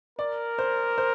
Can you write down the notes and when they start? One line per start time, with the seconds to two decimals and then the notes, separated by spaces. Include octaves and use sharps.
0.19 A#4 D5
0.58 C5
0.98 C5